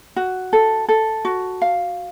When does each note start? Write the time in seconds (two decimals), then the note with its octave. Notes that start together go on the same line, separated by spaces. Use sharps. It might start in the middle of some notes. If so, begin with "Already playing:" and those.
0.16 F#4
0.53 A4
0.89 A4
1.25 F#4
1.62 F5